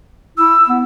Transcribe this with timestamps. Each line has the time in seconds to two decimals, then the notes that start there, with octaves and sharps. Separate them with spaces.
0.37 E4 E6
0.68 B3